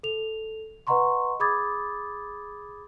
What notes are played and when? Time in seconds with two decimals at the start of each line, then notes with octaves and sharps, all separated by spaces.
0.03 A4 F7
0.87 B4 D#5 F#5 A#5 C6 C#6
1.40 G#4 B5 D6 D#6 G#6 A6